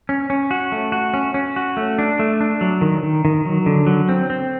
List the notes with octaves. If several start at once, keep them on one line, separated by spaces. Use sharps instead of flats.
C#4
C#4
F#4
A3
F#4
C#4
C#4
F#4
A3
D4
A3
D4
F#3
D#3
D#3
D#3
F#3
D3
F#3
C4
C4